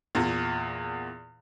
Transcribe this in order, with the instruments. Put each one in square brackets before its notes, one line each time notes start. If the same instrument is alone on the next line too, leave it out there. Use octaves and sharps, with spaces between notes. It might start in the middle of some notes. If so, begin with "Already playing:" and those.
[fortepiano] E2 A#2